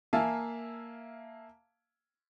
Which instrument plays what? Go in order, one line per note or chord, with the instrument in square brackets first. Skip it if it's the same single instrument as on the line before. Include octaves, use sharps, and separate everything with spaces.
[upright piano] A#3 E5 F5 G#5 A5